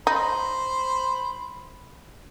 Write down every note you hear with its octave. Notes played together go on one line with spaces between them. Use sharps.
D#4 C5 B5